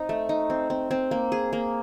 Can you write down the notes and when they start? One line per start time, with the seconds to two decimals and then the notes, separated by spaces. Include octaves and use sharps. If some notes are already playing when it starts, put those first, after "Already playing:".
Already playing: C4 D#4
0.09 A3
0.29 D#4
0.50 C4
0.70 C4
0.91 C4
1.11 A#3
1.32 G#4
1.53 A#3